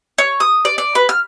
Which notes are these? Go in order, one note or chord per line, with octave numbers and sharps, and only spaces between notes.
C#5
D#6
D5
D5
B4
F6